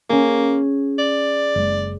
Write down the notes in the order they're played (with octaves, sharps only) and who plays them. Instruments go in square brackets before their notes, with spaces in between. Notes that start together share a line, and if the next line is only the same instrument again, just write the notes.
[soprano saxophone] A#3 [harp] C#4 G#4
[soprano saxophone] D5
[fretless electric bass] F#1 G#3